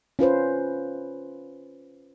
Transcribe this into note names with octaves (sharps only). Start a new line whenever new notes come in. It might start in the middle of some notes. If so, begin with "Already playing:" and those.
C#4 F4 B4 C5